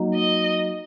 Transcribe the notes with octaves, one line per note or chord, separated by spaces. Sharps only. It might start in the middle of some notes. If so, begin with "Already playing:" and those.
Already playing: F#3 A#3 D#4
D#5